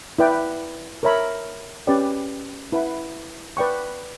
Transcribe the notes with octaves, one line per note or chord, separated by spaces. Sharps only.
E4 B4 D5 G5
A#4 C#5 E5 B5
C#4 G4 B4 D5 G5
E4 B4 F#5 B5
B4 D5 G5 C#6